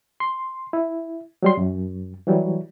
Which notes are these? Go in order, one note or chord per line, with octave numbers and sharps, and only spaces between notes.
C6
E4
F#3 G3 C6
F#2
E3 F#3 G3